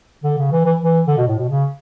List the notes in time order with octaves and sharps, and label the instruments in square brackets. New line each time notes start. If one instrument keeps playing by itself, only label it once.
[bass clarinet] D3
C#3
E3
E3
E3
D3
B2
A2
B2
C#3